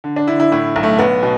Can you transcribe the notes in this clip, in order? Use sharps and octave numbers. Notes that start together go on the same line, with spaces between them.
D3
D4
D3 E4
E4
A2 E4
B1
A3
B1 B3
B2